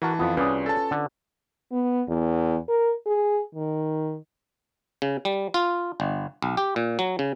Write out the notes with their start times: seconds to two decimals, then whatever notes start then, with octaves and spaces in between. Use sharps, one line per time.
0.02 E3 F#4 A#4 A5
0.19 F2 B3 F4
0.37 C2 C#4 G#4 B4 D5 G#5
0.66 A4 A5
0.91 D3
1.72 B3
2.08 E2
2.68 A#4
3.06 G#4
3.55 D#3
5.02 C#3
5.25 G3
5.54 F4
6.00 G1
6.42 B1
6.57 G4
6.76 A#2
6.99 F#3
7.19 C#3